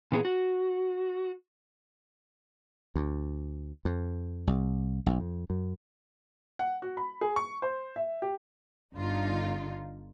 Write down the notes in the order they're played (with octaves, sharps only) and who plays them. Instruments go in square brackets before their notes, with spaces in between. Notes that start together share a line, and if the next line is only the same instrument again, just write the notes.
[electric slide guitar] A#2 E3 B3 F4 G#4
F#4
[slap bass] D2
F2
C2
B1
F2
F#2
[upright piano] F#5
F#4
B5
G#4
C#6
C5
E5
G4
[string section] G1 D3 D#4 F4